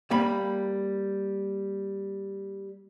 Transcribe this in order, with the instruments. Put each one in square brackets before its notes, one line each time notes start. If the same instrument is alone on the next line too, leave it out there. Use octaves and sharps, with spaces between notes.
[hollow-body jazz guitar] G3 A#3 B5